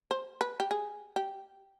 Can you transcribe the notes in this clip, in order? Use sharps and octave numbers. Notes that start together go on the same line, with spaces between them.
C5
B4
G4
G#4
G4